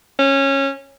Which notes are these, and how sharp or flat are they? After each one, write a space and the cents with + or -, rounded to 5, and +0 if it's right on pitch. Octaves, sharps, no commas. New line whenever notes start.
C#4 -15